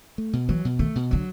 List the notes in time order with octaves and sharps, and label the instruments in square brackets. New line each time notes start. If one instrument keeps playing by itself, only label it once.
[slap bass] A3
B2
[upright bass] E3 [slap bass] F#3
[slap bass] B2
[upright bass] D#3 [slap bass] A3
[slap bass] B2
[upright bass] D3 [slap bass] F#3